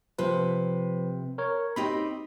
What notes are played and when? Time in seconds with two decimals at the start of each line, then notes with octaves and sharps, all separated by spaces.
0.19 C3 F3 B4
1.38 A#4 C#5
1.76 C4 D#4 G4 B5